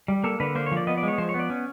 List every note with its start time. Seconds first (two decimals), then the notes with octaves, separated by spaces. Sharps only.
0.08 G3
0.24 A#3 A4
0.40 D3 B4
0.55 A#3 C5
0.66 C#5
0.72 F3
0.77 D5
0.87 B3 D#5
0.97 D5
1.03 G#3 C#5
1.18 F3 C5
1.29 C#5
1.34 B3
1.39 D5
1.50 C#4